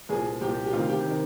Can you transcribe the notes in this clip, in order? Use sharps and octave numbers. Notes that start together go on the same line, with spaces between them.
C2 A#2 F3 G#4
C2 A#2 F3 G4
G4
D2 C3 D#3 F4
G4
C3 D#3